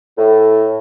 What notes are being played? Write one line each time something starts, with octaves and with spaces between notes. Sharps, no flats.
A2